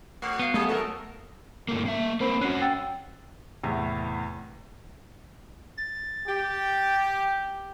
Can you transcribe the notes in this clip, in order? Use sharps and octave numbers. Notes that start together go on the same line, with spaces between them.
A3 F#4
B3 F5
F#3 A3 G#4 A4
D3 F#3 F#4 A4 A#4 A5
G2 A3 A#3
A#3 E5
A#3 C4 A#4 C5 B5
C#4 F#4 F#6 C7
G5 E6 A6
E2 A2 C3 B3
A6
G4